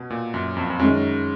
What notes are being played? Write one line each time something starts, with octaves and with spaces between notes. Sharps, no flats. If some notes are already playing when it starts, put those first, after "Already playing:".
Already playing: B2
A#2
F#2
F2
F2
F#2 D#3 G#3 C#4